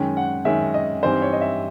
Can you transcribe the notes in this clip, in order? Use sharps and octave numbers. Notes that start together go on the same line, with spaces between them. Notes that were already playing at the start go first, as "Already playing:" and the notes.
Already playing: F#2 D#3 G#3 C#4 G5
F#5
F#2 D#3 G#3 C#4 E5
D#5
G2 E3 G3 C4 D#4 C5
C#5
D#5
E5